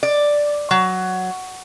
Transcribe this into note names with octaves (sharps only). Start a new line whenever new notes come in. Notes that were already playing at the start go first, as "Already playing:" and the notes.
D5
F#3